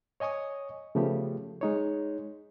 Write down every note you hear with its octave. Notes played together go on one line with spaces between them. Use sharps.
C#5 D#5 G#5 C#6 D#6
C#3 F3 A3 B3 G4
G#3 D#4 C#5